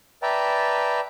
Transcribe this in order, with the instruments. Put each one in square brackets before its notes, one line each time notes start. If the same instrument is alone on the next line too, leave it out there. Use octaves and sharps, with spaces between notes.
[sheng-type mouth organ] B4 D5 E5 G5 A5 A#5